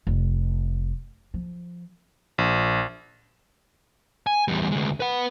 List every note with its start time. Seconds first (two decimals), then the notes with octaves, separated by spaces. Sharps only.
0.07 F1
1.34 F3
2.38 A#1
4.27 G#5
4.48 E2 G3
4.72 D2 G#3
5.00 B4 F#5